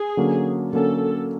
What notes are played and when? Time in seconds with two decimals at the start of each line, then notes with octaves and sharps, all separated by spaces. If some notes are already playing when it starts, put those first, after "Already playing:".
Already playing: G#4
0.17 D3 F#3 A#3 C#4
0.72 D3 F#3 A#3 C#4 A4